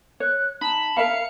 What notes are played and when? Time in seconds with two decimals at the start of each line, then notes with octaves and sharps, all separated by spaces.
0.20 C#5 F#6
0.61 D#4 A5 B5
0.97 A#4 E5 F5 B5 C#7